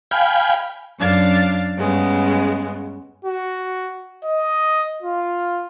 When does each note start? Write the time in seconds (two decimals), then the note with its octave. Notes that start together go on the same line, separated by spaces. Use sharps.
0.11 F5 G5 G#5 B5
0.99 F#2 D4 F5 A6
1.78 G2 C#3 G#3 B3
3.25 F#4
4.24 D#5
5.02 F4